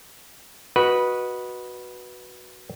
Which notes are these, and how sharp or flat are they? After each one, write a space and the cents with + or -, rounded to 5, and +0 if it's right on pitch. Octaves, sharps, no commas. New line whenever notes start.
F#4 +0 B4 -15 D#5 +0